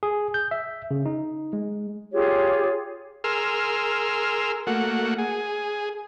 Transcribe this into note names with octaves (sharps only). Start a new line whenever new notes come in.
G#4
G6
E5
C#3
D#4
G#3
F4 G4 G#4 C#5
G#4 A#4 C6 E6 F6
A3 A#3 F#4 F#5
G#4